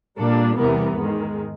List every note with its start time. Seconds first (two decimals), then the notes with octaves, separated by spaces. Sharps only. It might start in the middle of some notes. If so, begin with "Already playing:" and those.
0.18 A#2 G3 A#3 D4 A4
0.57 E2 C3 E3 G3 B3 A#4
0.97 G#2 D#3 G#3